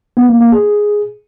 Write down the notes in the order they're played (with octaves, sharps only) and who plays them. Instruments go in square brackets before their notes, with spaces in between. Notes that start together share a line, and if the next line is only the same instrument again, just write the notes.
[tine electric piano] B3
A#3
A#3
G#4